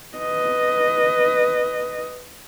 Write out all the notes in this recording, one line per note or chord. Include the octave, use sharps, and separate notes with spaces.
B4 D#5